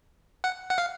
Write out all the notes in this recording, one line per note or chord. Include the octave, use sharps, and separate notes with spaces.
F#5
F#5
F5